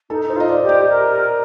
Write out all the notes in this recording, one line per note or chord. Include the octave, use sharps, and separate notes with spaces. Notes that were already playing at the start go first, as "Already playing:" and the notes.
D#4 A4
D#4 C5
F4 D#5
D5
G4
D5
A#4